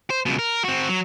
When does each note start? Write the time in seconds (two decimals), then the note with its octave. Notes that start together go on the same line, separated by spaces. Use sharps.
0.10 C5
0.26 C#2 B2
0.39 A#4
0.64 C4 F#4
0.89 F#3